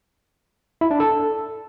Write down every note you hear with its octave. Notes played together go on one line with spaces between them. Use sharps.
E4
D4
A4